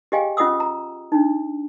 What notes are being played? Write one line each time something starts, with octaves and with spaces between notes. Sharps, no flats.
G4 G#4 D#5 F5 G5 G#5
C#4 F4 D#5 F#5 D#6 E6
A#5
D4 D#4